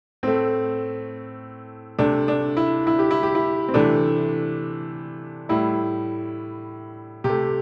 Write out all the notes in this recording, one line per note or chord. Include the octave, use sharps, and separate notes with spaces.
A2 A3 C4
C3 A3 D4
D4
E4
E4
G4
E4
G4
E4
C4
C3 E3 A3 D4
A2 G3 E4
C3 G4
A3